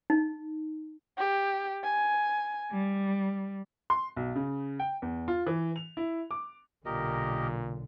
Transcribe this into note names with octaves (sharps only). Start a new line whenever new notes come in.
D#4
G4
G#5
G3
C6
B1
C#3
G5
E2
F4
E3
F7
E4
D6
B1 A#2 D3 G4 A#4 D#5